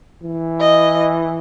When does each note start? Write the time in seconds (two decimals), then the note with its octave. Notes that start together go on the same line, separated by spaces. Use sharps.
0.23 E3
0.60 D#5